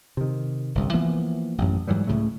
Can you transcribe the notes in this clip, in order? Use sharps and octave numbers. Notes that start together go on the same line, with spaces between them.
C3 D#3
G1 C2
E3 F3 A#3 B3
A1 F#2
G#2 E3 F#3 G3
C#2 A2 C#3 A3